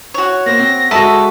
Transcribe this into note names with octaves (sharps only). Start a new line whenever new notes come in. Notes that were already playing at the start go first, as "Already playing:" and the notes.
F#4 C#5
A#3 C5 A#6
C4
G#3 F#4 A4 D#5 E5 A5 B5